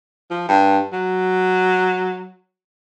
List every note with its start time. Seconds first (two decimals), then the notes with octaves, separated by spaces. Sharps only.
0.31 F3
0.49 G2
0.93 F#3